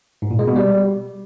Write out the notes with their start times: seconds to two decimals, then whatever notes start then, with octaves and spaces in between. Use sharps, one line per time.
0.22 G#2
0.31 A#2
0.39 G#3
0.47 B2
0.56 G3